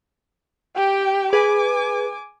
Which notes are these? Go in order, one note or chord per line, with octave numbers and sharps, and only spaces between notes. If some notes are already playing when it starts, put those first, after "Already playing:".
G4 G5
G#4 B4 G#5 D6